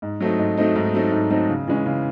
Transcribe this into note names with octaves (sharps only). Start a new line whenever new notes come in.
G#2
F#3 A3 C4 D#4
G#2
F#3 A3 C4 D#4
G#2
F#3 A3 C4 D#4
G#2
F#3 A3 C4 D#4
C#3
E3 G#3 C#4
C#3